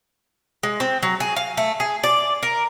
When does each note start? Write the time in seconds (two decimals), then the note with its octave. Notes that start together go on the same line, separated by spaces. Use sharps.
0.63 G#3
0.80 C4
1.03 F#3
1.20 G#4
1.36 F5
1.57 A3
1.80 G#4
2.03 D5
2.43 A#4